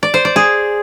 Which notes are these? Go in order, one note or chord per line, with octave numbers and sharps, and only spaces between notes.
D5
C5
D5
G#4